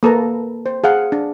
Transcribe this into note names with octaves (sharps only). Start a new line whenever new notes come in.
A#3 A4 B4 A#5
C5
G#4 F5 F#5
D4